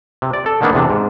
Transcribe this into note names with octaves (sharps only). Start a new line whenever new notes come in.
C3
D5
A4
D3 D#3 A#3 B3 D4
E2 C3 D4
G#2